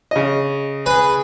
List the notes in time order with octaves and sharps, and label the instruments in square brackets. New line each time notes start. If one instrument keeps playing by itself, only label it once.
[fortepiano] C#3 D#5
[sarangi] G#4 [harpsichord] B4